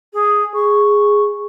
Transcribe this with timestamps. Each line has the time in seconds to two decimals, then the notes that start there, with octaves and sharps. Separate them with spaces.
0.13 G#4
0.54 G#4 C#6